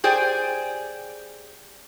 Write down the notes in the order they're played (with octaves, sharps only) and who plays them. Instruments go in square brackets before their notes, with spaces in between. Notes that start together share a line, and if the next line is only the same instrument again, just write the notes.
[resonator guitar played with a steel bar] G4 G#4 C5 D5 G5 G#5